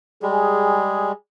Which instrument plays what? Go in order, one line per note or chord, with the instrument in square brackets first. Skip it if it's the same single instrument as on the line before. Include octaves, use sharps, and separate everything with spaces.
[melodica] G3 G#3 [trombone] G#4